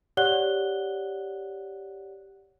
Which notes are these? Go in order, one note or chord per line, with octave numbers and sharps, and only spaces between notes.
G4 C#5 D5 F#5 F#6 G7